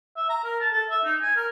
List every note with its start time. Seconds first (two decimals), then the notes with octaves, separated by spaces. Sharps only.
0.17 E5
0.30 A#5
0.44 A#4
0.61 A5
0.73 A4
0.90 E5
1.05 D#4
1.22 G#5
1.36 A#4